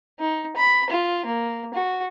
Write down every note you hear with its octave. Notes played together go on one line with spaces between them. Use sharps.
D#4
B5
F4
A#3
F#4